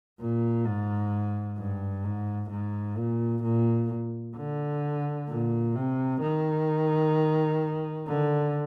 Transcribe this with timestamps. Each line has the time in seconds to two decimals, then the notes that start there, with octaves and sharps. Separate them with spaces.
0.19 A#2
0.65 G#2
1.58 G2
2.04 G#2
2.51 G#2
2.97 A#2
3.43 A#2
4.37 D3
5.29 A#2
5.75 C3
6.21 D#3
8.07 D3